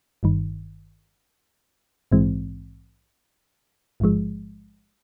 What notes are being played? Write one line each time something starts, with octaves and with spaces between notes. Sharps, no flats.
G1 G2 D#3
A#1 G#2 E3 G#3 C4
A1 G#2 F3 G#3